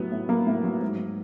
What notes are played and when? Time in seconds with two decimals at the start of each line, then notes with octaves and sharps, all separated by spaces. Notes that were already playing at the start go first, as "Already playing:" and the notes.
Already playing: A2 F#3 B3
0.12 A2
0.29 F#3 A#3
0.47 A2
0.64 F#3
0.82 G#2